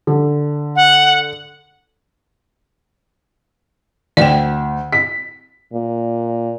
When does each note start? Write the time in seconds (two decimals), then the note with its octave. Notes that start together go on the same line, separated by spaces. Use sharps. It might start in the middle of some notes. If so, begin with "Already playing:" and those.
0.07 D3
0.76 F#5
4.17 D2 D5 G5
4.93 B6
5.73 A#2